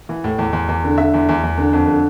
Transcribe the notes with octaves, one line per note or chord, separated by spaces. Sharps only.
E3
A2
E2
E2
E2
D3
D3 E5
E2
E2
E2
D3
F2
D3